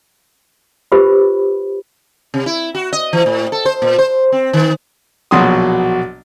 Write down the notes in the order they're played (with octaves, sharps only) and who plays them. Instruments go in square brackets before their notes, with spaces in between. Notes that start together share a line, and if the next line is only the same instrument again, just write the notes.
[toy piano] F4 G4 B4 C5 B5
[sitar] C3
E4
F#4
D#5
E3
A2
A4
C5
A#2
C5
C4
D#3
[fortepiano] A#1 B2 F#3 C6 D#6